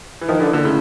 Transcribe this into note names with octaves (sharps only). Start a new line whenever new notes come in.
E3
D#3 F3
D3 E3
A#2 D3
A2 C#3